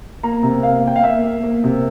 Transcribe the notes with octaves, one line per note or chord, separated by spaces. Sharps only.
A#3 A#5
C3
A#3 F5
A#3 G5
F5
A#3 E5
A#3
A#3
C3